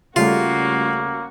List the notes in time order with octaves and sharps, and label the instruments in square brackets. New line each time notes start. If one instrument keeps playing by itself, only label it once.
[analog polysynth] C#3 G3 A3 [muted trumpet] A#3 [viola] C#4 F#4 [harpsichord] F4